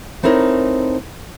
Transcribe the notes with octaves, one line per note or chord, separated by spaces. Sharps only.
A3 C4 D#4 E4 A#4 C#5